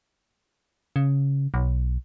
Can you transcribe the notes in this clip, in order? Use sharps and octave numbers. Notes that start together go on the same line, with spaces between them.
C#3
B1